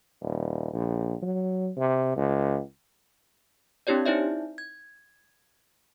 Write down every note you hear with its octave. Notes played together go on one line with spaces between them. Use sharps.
D#1
A#1
F#3
C3
C#2
C4 D4 E4 G4 C#5 D5
D#4 E4 C5 D5 E5
G#6